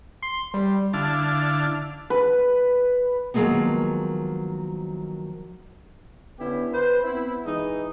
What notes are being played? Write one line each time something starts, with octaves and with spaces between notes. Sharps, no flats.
C6
G3
D3 D4 E4 F5 A5
B4
D#3 F3 F#3 G#3 A#3 B3
D3 B3 C#4 E4 G4
B4 C5
B3 C4 E4
E3 G#3 D#4